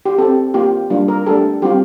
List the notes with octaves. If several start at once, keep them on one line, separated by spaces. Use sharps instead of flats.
G4
C4 G4 A4
A#3 F4 G4
G3 A#3 D4 F4
A#4
A3 D4 G4 A4
G3 C4 F4 G4